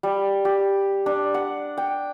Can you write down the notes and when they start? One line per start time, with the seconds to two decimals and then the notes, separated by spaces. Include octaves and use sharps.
0.03 G3
0.45 G4
1.06 D4
1.34 F#5
1.77 G5